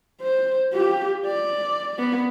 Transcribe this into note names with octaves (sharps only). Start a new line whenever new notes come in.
C5
F4 G4
D5
B3